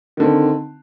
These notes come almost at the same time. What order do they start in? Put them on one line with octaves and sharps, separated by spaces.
D#3 D3 C4